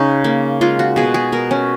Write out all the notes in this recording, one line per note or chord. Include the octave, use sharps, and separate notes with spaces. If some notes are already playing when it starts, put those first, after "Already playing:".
Already playing: C#3 C#4 D#4
A#3
G#3 F4
F#4
B2 G#4
G#4
B2 A#4
C#4